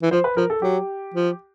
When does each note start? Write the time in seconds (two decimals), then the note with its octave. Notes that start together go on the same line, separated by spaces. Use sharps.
0.02 E3
0.11 F3 C5
0.24 B4
0.37 F3 A#4
0.50 A4
0.62 F#3 G4
1.14 F3